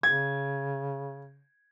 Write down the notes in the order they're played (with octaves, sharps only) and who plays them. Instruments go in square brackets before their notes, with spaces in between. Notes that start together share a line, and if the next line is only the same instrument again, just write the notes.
[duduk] C#3 [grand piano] G#6